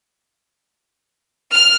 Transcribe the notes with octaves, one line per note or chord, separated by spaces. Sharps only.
F6